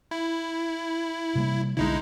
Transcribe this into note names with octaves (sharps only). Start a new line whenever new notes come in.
E4
C3 G3 A#3
B1 B2 D3 G#3 D#4 E4